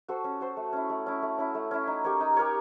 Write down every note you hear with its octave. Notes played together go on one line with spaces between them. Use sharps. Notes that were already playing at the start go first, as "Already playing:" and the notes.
F#4 A4 C5
C#4
F#4 A4 C5
A3
C#4 E4
A3
C#4 E4
A3
C#4 E4
A3
C#4 E4
D#4
G4 A#4 C#5
D#4
G4 A#4 C#5